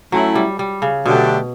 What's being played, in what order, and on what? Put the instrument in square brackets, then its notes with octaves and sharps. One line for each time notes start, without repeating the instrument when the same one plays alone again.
[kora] F#3 [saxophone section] A3 C#4 E4
[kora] G3
G3
C#3
[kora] B2 [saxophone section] D3 F#3 A3 D4 G4